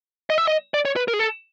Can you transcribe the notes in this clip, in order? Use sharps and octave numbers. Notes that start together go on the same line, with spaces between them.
D#5
E5
D#5
D5
C#5
B4
A#4
G#4
A4